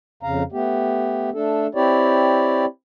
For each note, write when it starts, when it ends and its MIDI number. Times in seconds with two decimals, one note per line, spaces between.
0.23 0.43 41
0.23 0.43 49
0.23 0.43 77
0.23 0.43 82
0.52 1.30 57
0.52 1.30 59
0.52 1.30 67
1.34 1.67 57
1.34 1.67 62
1.34 1.67 69
1.75 2.65 60
1.75 2.65 64
1.75 2.65 67
1.75 2.65 73
1.75 2.65 74